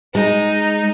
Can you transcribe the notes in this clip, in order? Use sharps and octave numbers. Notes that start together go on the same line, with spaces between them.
G#3 D#4